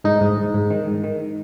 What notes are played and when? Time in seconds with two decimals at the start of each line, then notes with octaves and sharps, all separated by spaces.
0.04 G#2 D#4
0.21 G#2
0.37 G#2
0.54 G#2
0.70 D#3
0.87 G#2
1.04 D#3